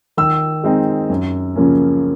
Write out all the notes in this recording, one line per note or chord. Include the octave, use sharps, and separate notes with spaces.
D#3 E6
G#3 C4 D#4
F#2
C#3 F3 A#3 C#4